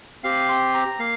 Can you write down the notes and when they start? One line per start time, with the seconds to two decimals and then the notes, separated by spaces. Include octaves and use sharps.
0.24 C4 G4 F5
0.49 C6
0.74 A#5
0.99 A#3 F5